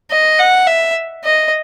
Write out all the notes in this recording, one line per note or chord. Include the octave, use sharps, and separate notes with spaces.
D#5
F#5
E5
D#5